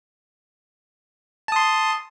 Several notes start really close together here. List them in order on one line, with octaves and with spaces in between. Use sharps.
A5 D#6 C6